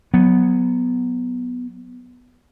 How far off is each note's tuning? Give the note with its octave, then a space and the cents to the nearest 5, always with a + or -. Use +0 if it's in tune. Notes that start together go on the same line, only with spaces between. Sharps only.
F#3 -10 B3 +0